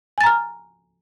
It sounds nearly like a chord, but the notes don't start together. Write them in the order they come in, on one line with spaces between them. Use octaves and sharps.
G#5 A6 A#5 F6